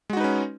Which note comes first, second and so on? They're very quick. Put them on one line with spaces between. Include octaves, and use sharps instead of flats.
G#3 F#4 D#4 B4 C#4